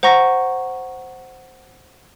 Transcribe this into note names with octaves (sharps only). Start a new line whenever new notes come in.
C5 F#5 A#5 C#6 A#6